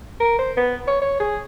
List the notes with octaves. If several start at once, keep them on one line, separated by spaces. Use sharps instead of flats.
A#4
C5
B3
C#5
C#5
G#4